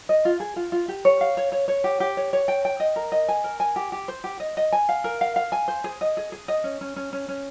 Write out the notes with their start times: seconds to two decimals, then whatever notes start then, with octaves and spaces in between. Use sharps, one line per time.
0.09 D#5
0.25 F4
0.40 G#4
0.56 F4
0.72 F4
0.88 G4
1.05 C#5
1.21 F5
1.37 C#5
1.52 C#5
1.68 C#5
1.84 G4
2.00 G4
2.17 C#5
2.33 C#5
2.48 G5
2.65 G5
2.80 D#5
2.96 A#4
3.12 D#5
3.28 G#5
3.44 A#4
3.60 G#5
3.76 G4
3.92 G4
4.08 C5
4.24 G4
4.40 D#5
4.57 D#5
4.72 G#5
4.89 F5
5.04 A#4
5.21 F5
5.36 F5
5.52 G#5
5.68 C5
5.84 G#4
6.01 D#5
6.17 G#4
6.32 G#4
6.48 D#5
6.64 C#4
6.81 C#4
6.96 C#4
7.13 C#4
7.28 C#4